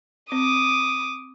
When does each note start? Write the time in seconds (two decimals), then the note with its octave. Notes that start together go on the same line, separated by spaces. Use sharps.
0.32 C4 D6 D#6